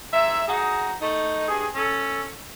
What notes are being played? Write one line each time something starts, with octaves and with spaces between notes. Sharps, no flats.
G#2 E5
D#4 F#4 G#4
A3 D#4
G2 G#4
C#4 A4